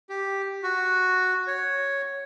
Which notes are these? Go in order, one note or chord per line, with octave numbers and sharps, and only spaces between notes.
G4
F#4
C#5